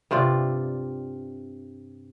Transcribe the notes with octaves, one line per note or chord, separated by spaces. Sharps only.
G2 C3 F4 D5